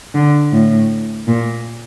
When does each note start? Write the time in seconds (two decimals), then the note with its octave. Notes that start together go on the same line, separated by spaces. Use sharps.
0.15 D3
0.52 A2
1.27 A#2